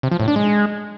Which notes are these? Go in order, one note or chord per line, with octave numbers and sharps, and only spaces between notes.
C3
F3
A2
D4
G#3